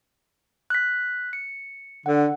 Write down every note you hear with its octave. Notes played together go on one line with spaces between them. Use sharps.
F#6 B6
C#7
D3 F#5